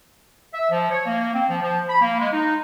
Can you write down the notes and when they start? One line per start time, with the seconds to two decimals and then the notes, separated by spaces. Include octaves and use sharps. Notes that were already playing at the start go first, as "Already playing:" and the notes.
0.54 E5
0.71 F3
0.91 C#5
1.06 A#3
1.34 C4
1.49 F3
1.62 F3
1.89 B5
2.02 A#3
2.20 G#3
2.33 D#4